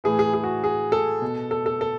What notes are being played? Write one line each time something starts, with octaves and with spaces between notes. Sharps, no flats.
A2 E3 G#4
G#4
G#4
F#4
G#4
A4
B2
A4
A4
A4